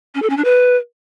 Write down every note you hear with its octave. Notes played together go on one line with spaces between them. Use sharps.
C#4
A4
C#4
D4
B4